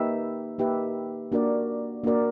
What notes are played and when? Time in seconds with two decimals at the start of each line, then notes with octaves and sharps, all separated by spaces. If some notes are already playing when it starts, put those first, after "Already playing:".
Already playing: A#3 D#4 G4 B4 E5
0.58 A#3 D#4 G4 B4 E5
1.32 A#3 D4 F#4 A#4 D5
2.04 A#3 D4 F#4 A#4 D5